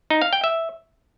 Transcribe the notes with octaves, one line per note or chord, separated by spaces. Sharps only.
D#4
F5
G5
E5